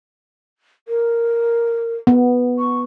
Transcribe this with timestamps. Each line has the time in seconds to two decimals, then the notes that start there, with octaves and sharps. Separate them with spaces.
0.88 A#4
2.07 B3
2.59 C#6